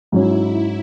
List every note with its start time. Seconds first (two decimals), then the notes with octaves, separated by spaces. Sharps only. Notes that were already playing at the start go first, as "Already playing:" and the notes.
0.12 G#2 F#3 C#4 E4 F#4